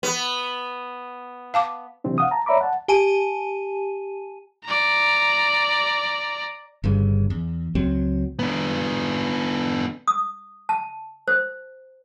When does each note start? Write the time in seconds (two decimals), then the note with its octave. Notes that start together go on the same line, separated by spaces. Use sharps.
0.03 B3
1.54 F5 A5 D6
2.04 C3 E3 F#3 C4 D4
2.18 F5 F#5 D#6
2.31 A5 A#5
2.46 C#5 D5 E5 A#5 B5 D6
2.61 F#5 A5
2.88 G4 G#5 A5 D#7
4.65 D5 A#5
6.84 G1 G2 C#3
7.30 E2
7.75 C#2 F#3 C4
8.39 B3 D4
10.08 D#6
10.69 A5
11.28 C5